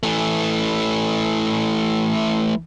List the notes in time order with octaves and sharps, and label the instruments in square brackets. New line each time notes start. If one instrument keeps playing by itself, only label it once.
[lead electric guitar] E3 A3